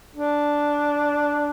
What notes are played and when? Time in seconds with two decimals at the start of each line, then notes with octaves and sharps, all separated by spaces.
0.15 D4